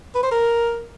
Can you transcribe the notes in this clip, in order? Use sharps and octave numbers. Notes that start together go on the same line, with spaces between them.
B4
C5
A#4